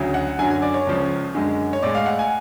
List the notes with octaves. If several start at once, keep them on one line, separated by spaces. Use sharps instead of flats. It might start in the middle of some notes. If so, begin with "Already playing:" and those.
Already playing: D2 C#3 F#3
F#5
F#2 D3 F#3 G#5
G#5
D5
C#5
C#2 C#3 F3
F#2 D3 G#3
C#5
A2 G#3 D5
F5
F#5
G#5